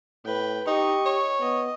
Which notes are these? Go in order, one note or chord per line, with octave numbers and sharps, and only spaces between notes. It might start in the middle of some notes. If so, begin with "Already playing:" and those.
A2 B4 G5
D#4 G4 D#5 C#6
C#5
B3 D#5